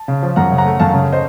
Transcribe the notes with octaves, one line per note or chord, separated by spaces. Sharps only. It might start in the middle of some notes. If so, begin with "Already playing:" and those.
Already playing: A5
C#3
F3
F#2 F#5 A#5
C#3
F#5 A#5
A3
F#2 F5 A5
C#3
C5 D#5